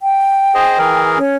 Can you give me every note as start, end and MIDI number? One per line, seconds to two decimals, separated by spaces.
0.02 1.03 79
0.55 0.78 68
0.55 0.78 72
0.55 0.78 75
0.79 1.19 52
0.79 1.19 68
0.79 1.19 70
1.17 1.36 61